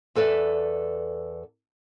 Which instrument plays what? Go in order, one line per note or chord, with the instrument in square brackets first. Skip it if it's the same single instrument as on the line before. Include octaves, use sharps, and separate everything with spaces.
[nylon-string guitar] E2 A4 B4 D5 E5